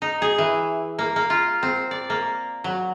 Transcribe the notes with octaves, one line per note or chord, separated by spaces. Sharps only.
D#4
G#4
E3
A#3
A#3
F4
C4
D5
A#3
F#3